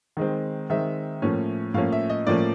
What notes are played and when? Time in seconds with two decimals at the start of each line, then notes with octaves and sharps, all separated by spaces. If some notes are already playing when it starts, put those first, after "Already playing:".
0.17 D#3 G#3 C4
0.70 D#3 G#3 C4 E5
1.22 A2 F3 A#3 C#4
1.74 A2 F3 A#3 C#4 F5
1.92 E5
2.10 D#5
2.27 A2 F3 A#3 C#4 D5